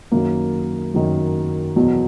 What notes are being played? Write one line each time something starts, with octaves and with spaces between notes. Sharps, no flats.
F#2 D#3 F#3 A#3
F#2 D#3 F#3
E2 B2 F#3